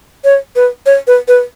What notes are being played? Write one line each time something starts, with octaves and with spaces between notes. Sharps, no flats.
C#5
B4
C#5
B4
B4